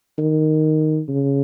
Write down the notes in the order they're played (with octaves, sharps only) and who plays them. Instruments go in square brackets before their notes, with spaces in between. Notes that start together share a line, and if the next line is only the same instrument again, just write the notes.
[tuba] D#3
C#3